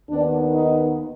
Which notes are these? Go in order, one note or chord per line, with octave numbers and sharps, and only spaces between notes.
D#2 D#3 B3 D4
D#4